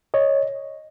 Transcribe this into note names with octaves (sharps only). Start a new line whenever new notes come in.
C#5 D#5